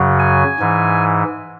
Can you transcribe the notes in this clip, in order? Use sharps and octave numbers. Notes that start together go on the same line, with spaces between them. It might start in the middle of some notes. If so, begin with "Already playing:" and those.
Already playing: F#2 C#3 F#3
G#5
G#2 E3